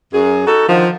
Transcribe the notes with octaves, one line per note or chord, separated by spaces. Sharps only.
F#2 G#4
D#4 F#4 A4
D3 D#3 F3